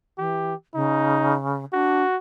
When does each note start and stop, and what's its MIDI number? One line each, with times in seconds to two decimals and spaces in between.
0.18 0.54 52
0.18 0.55 67
0.75 1.65 49
0.75 1.35 63
1.73 2.03 62
1.73 2.17 66